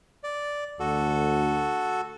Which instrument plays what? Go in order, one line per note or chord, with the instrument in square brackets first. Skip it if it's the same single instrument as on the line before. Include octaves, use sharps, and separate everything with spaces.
[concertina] D5
[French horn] D2 [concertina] F#4 A4